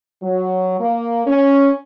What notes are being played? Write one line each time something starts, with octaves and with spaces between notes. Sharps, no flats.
F#3
A#3
C#4